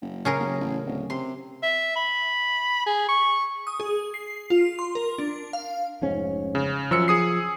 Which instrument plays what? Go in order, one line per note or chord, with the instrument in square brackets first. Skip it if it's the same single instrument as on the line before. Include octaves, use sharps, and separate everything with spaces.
[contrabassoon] F#1
[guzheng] C#3 G#4 A#4
[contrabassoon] F#1
A1
D1
[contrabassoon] C3 [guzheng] C6
[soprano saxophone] E5
B5
G#4
C#6
[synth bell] D#6
G#4
C7
F4
C6
A#4
D4
F5
[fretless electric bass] F1 G#2 C#4
[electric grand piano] C#3
[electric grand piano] F#2 E6 C#7 [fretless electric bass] F3
[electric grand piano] G#4 D#6 C7